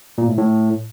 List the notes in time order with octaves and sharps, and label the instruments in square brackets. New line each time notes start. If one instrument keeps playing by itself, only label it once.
[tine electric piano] A#2
A2
A2